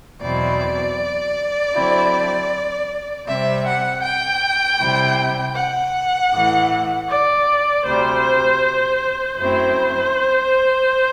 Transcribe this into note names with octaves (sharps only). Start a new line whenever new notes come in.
E2 B2 F#3 C4 E4 D5
D3 F#3 C4 E4
C3 G3 C4 E5
F#5
G5
C3 G3 C4 E4
F#5
A2 E3 A3
D5
D2 C3 G3 C5
F#2 F#3 A3 C4 E4 C5